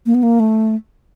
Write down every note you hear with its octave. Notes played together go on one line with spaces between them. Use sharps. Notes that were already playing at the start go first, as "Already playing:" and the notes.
A#3
B3
A#3
A3